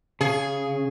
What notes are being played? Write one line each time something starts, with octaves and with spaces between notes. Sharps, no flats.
C#3 G#4